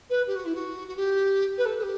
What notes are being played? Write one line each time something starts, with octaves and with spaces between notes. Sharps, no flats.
B4
G4
F#4
E4
F#4
F#4
G4
B4
A4
A4
G4